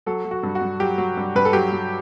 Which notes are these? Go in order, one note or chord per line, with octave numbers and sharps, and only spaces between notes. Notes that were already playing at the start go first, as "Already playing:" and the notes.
F#3 A4
F#3
F#4
G2
F#4
G2
F#3 G4
F#3
G2
G2 B4
A4
F#3 G4
F#3